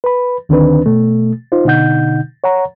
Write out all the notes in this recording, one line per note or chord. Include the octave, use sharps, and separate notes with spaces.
B4 B5
D2 D3 D#3 C4 D4 B4
B2 A3
D#4 F4 C5
B2 D3 D#4 F#5 G6
C#5 F#5 A#5